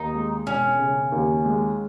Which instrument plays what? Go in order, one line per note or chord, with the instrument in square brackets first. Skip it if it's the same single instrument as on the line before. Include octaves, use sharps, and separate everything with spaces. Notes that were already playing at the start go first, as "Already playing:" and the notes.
Already playing: [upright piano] D#2 [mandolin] D#4
[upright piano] G#3
[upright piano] E1 [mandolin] C#4
[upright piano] C#3
D#2
G#3